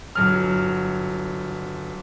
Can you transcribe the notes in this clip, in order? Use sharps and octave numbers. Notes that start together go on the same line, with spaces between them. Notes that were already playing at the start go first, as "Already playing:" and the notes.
G1 F#3 F6